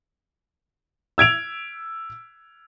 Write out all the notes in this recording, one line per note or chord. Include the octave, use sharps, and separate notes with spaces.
E6 G#6 D7 F7